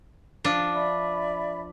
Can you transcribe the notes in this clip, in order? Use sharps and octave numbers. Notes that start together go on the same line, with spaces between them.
F3 D4
D5 E5 B5